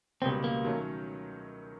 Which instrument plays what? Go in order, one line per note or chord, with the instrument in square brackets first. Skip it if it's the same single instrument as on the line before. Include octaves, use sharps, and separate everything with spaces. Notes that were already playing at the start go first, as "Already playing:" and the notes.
[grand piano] C#2 B2 G3 A#3 C#4 [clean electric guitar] C4
[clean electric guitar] A#3
[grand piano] D#3 F#3 A3 C#4